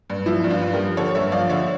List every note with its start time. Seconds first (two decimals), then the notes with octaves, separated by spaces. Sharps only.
0.10 G2
0.26 F3 E4
0.44 G2
0.50 D4 F4
0.62 G2
0.73 G4 A#4
0.79 F3
0.97 D3 A4 C#5
1.15 G2 C#5 E5
1.32 F3 D5 F5
1.49 D3 C#5 E5